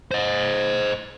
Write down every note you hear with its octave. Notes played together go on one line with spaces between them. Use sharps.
C5 D#5